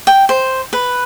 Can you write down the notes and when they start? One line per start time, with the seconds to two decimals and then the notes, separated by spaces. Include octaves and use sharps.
0.07 G5
0.29 C5
0.73 B4